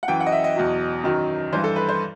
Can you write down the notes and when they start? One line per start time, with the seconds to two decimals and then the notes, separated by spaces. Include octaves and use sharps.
0.03 F#5
0.08 F#2 E3 G5
0.20 F#5
0.26 D#5
0.32 E5
0.44 D#5
0.56 E2 B2 F#3
1.03 F#2 D#3 F#3
1.53 G2 E3 C5
1.64 A4
1.76 B4
1.89 C5